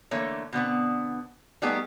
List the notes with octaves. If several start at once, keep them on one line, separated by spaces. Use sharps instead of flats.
D3 E3 A3 A#3 C#5
B2 D3 B3 C4
G3 A3 B3 D#4 G4 G#4